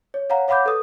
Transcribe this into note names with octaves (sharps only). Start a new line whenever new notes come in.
C#5
C#5 F5 F#5 A#5
C#5 F5 F#5 B5 D6 G6
A4 B4 D#6